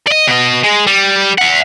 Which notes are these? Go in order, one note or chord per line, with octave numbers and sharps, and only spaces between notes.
D5 D#5
B2 D#5
G#3
G3
E5 F#5